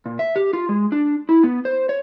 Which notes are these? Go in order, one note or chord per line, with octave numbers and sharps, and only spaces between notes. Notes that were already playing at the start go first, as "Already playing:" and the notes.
A#2
E5
G4
F4
G#3
D4
E4
B3
C5
C#5